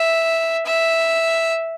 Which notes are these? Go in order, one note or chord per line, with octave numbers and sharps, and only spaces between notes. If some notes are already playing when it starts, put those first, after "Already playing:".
Already playing: E5
E5